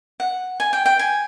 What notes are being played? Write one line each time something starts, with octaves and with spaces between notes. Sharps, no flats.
F#5
G#5
G5
G5
G#5